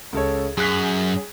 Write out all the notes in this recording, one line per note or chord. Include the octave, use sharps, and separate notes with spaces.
C#2 A4 C#5
F#2 G#4 F#6 B6